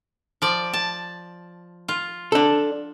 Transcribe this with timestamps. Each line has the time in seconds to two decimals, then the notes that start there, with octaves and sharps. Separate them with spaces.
0.42 F3 D5
0.73 A5
1.88 F4
2.32 D4 A4